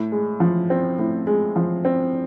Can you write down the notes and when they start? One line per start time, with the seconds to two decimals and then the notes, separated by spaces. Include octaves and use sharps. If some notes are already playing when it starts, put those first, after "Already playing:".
Already playing: A2
0.12 G#3
0.40 F3
0.70 C4
0.99 A2
1.27 G#3
1.56 F3
1.85 C4